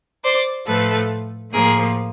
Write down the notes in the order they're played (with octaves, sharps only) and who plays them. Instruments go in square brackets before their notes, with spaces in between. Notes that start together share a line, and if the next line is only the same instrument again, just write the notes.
[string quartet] C5 D5
A2 F3 A3 A4 B4
A2 F3 A#3 G#4 A#4